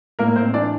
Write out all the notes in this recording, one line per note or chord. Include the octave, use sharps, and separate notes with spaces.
A2 A#3 A#4
A2 C4 C5
E3 D4 D5